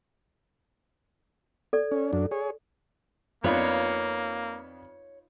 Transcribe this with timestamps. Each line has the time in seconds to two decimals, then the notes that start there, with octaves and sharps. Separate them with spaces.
1.73 A4 D5
1.92 C#4
2.13 F#2 D4
2.31 G#4 C#5
3.44 F2 A#3 B3 D4 D#4 F4 B4 C#5